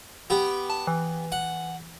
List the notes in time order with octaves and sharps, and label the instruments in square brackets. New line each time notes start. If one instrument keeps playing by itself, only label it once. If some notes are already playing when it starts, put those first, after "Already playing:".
[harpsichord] B3 G4
[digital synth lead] A5
E3
[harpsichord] F#5